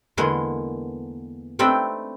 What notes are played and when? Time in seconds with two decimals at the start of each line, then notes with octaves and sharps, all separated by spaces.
0.17 E2 D3 G#3 A#3 B3 C6
1.59 A3 C4 D4 D#4 B4 G5